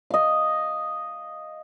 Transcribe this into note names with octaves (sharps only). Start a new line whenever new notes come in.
D#5 F5